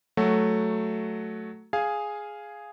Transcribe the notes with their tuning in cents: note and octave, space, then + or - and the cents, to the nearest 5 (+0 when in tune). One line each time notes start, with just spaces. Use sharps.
F#3 +0 A3 +0 F#4 +0
G#4 +0 F5 +0 G#5 +0